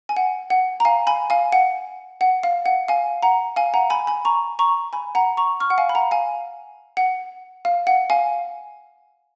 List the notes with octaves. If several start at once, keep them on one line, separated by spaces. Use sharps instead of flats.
G#5
F#5
F#5
A#5
F5 G#5
G#5 B5
F5 G#5
F#5
F#5
F5
F#5
F5 G#5
F#5 A#5
F5 G#5
F#5 A#5
G#5 B5
G#5 B5
A#5 C#6
A#5 C#6
G#5 B5
F#5 A#5
A#5 C#6
C#6 F6
F#5
F5 G#5
B5
F#5 A#5
F5 G#5
F#5
F5
F#5
F5 G#5